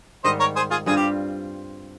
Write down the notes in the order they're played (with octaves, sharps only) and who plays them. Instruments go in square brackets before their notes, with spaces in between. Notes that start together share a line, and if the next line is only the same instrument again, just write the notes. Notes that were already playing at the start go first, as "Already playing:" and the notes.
[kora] G#2 D#3 G3 [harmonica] C5 D#5
[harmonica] A#4 C#5
G#4 C5
F4 G#4
[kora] G2 G3 C4 F4 [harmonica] G#4
[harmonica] G4